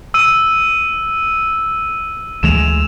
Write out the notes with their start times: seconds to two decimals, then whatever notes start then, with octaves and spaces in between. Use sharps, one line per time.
0.14 E6 D#7
2.43 D2 E3 G#3 E7 F7